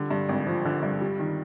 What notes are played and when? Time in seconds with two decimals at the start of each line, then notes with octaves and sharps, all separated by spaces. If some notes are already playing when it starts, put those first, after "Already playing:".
Already playing: D3 G3
0.10 G2
0.29 G#1
0.46 F3
0.65 D3
0.83 G2
1.01 G3
1.19 D#3